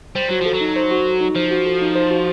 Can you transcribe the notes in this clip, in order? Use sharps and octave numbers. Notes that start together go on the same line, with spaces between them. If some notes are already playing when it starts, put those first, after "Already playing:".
G3 C5
F#3 F#4
F3 A4
F#3
D#4
C5
F#4
A4
D#4
F3 C5
F#4
A4
D#4
C5
F#4